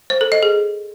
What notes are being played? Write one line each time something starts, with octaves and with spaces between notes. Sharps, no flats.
C5
A4
D#5
G#4